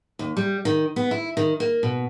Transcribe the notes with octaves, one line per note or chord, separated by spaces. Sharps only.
D#2
G3
D#3
B3
E4
D#3
A#3
B2